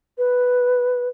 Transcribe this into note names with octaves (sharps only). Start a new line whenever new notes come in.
B4